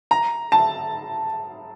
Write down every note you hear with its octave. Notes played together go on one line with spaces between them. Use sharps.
A#5
A5